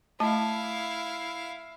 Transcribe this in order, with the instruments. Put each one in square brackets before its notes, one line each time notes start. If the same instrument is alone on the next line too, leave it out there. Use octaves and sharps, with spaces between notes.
[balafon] A3 A5 [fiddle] E4 F5